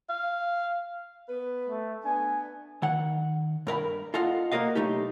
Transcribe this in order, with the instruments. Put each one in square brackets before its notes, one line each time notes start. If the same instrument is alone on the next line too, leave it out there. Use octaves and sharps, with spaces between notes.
[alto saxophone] F5
[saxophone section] B3 B4
[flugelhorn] A3
[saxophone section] B3 D4 [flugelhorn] G#5
[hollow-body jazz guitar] D#3 F#5
G2 A#4 F5 B5
F4 A4 D#5 F5 F#5
A#3 F#4 A#4 D#5 F5
B1 A3 D#4 G4